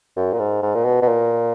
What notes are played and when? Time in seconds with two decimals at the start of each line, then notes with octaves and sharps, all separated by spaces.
0.16 F#2
0.32 A#2
0.39 G#2
0.62 G#2
0.75 A#2
0.85 B2
1.02 B2
1.08 A#2